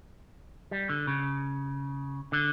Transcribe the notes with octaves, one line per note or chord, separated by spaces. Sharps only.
G3
D3
C#3
D3